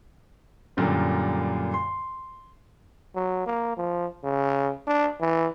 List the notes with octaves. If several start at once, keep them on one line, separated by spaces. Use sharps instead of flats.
F#2 A#2 D3 G3
C6
F#3
A#3
F3
C#3
D4
E3